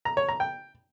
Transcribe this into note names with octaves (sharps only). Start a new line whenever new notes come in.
A#5
C#5
A#5
G5